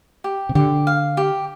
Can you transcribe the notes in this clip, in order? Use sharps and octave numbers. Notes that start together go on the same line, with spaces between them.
G4
C3
D3 G4
F5
G4